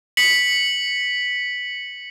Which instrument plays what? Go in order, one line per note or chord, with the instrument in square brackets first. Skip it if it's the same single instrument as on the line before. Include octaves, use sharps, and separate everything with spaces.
[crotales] B6 C#7 F#7